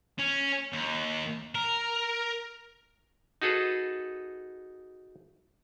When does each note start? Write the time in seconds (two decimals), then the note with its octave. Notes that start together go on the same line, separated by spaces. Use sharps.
0.19 C#4
0.72 D#2
1.55 A#4
3.42 D#4 F#4 G#4 A4 B4